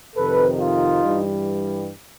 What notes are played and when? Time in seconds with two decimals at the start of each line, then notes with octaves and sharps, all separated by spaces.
0.16 F2 C3 D#3 A4 B4
0.60 D#4 F4
1.04 G2 E3 G3